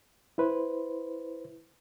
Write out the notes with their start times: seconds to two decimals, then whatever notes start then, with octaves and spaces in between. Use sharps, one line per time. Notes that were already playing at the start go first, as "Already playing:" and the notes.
0.38 E4 B4 C5